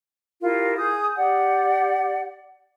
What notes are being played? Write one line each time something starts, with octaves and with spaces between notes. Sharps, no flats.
E4 F4 G4 A#4
G#4 D#6 G6
G4 D5 F#5